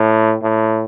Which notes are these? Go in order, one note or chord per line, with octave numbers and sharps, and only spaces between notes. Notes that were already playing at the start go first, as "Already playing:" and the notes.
Already playing: A2
A2